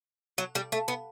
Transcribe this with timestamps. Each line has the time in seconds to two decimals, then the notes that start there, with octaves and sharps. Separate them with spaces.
0.38 F#3
0.55 G3
0.72 A3
0.88 B3